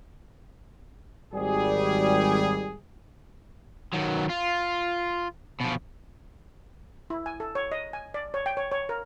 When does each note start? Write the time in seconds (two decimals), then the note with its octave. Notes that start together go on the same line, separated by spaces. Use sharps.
1.34 G#1 G3 G#4
3.93 D#3 F#3
4.30 F4
5.60 B2 F3
7.10 E4
7.26 G#5
7.40 A4
7.55 C#5
7.72 D#5
7.93 G#5
8.14 D5
8.34 C#5
8.46 G5
8.57 C#5
8.71 C#5
8.89 A#4